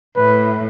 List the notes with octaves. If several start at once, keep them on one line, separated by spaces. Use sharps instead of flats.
A2 B4